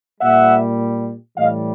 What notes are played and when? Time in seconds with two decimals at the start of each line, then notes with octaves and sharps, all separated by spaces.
0.20 A#2 G3 E5 F#5
1.37 A2 E3 G3 D#5 F5